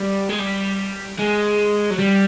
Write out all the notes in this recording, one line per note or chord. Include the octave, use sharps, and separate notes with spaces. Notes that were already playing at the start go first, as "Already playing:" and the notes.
Already playing: G3
G#3
G3
G#3
F#3
G3